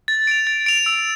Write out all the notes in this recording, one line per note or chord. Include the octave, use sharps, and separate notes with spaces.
A6
D7 F7
A6
D7 F7
E6